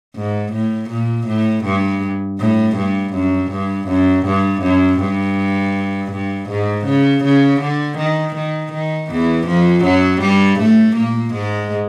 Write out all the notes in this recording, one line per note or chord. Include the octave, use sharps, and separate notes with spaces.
G#2
A2
A#2
A2
G2
A2
G2
F#2
G2
F#2
G2
F#2
G2
G2
G#2
C#3
C#3
D3
D#3
D#3
D#3
E2 E3
F2 F3
F#2 F#3
G2 G3
A2 A3
A#2 A#3
G#2 G#3